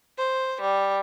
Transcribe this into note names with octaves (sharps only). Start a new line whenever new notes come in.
C5
G3